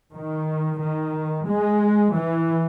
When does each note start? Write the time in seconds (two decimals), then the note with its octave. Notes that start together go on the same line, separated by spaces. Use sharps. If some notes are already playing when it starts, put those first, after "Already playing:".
0.12 D#3
0.78 D#3
1.46 G#3
2.13 E3